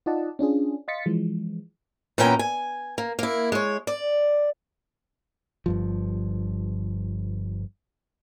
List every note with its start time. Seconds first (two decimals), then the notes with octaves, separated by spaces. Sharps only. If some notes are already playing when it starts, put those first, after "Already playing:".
0.06 D#4 F4 D5 D#5 F#5 A5
0.39 C#4 D4 F4 G#4
0.88 D#5 F5 C6 A6 B6 C#7
1.06 E3 F3 G#3
2.18 A#2 E3 B3 C#4 G5 A#5
2.39 G#5
2.98 A#3
3.19 A#3 E4
3.52 G#3 C#5
3.87 D5
5.66 G1 G2 F3